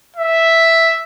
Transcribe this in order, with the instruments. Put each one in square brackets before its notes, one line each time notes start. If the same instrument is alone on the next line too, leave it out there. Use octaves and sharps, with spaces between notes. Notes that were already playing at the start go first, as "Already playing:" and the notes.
[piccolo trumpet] E5